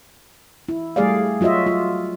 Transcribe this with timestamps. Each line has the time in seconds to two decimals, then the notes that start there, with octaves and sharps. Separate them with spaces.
0.69 E4
0.96 G3 A3 G#4 D5 F5
1.41 F#3 F4 F#4 D#5 E5
1.67 F4